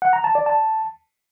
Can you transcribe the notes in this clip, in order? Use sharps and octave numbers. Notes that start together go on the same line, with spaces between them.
F#5
A#5
A5
D5
A5